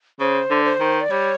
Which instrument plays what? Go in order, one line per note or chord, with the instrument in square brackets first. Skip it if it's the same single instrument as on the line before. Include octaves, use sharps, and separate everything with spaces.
[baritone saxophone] C#3 [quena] C5
[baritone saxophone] D3
[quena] C5
[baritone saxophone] D#3
[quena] D5
[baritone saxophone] G3 [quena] C#5